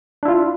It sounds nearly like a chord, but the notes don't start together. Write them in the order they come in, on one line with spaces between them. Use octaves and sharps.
D4 E4 F4